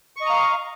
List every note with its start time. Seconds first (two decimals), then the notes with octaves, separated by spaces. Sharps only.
0.16 C#6
0.21 D#5
0.25 A#5
0.30 F5